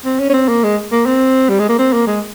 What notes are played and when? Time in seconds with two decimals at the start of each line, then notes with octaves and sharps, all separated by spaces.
0.05 C4
0.19 C#4
0.29 C#4
0.33 C4
0.48 A#3
0.63 G#3
0.92 A#3
1.06 C4
1.49 G3
1.59 G#3
1.69 A#3
1.78 C4
1.93 A#3
2.07 G#3